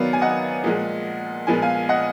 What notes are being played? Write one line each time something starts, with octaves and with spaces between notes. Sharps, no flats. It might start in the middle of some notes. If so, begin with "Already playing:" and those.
Already playing: D#3 F#3 B3 D5 F5
G#5
D#5 F#5
A#2 F3 G#3
A#2 F3 G#3 B3 G#5
F5 G#5
D#5 F#5